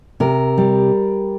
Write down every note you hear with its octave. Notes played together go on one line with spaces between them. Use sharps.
C3 A#4
G3